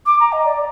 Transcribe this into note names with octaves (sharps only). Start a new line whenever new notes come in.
D6
A#5
D#5
D5